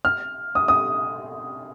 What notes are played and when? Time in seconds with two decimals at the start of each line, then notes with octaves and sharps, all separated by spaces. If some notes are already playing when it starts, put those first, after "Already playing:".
0.05 F6
0.55 D#6
0.68 D#6